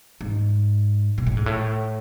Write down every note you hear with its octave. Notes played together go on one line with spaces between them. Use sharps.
G#2
B2
A2
G#2
A2